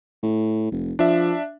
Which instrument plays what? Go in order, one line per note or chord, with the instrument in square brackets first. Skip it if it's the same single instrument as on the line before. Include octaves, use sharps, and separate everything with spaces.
[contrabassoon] A2
F1
[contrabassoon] F3 [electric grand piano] D4 E5